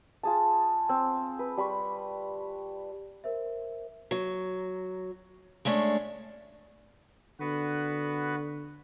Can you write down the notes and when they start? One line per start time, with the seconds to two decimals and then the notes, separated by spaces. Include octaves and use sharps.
0.23 F4 G#4 A5
0.89 C4
1.39 B4
1.57 G3 B5 C#6
3.24 A#4 C5 E5
4.11 F#3
5.65 G#3 A3 C#4 D4
7.40 D3 B3 F#4 B4